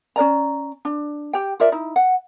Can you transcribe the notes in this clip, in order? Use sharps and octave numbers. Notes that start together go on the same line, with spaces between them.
C#4 A#4 D5 A#5
D4
G4 G5
F4 A#4 D5 E5
D#4 E4
F#5